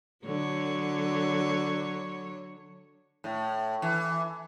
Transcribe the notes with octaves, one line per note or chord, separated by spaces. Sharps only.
D3 F#3 C#5
A2
E3